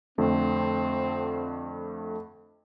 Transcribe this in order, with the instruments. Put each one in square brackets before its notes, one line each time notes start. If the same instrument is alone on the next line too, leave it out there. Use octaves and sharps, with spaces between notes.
[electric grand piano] F2 D3 A3 [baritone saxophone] C4